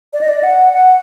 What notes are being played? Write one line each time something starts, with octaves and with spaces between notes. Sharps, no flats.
D5
D#5
D5
F#5
F#5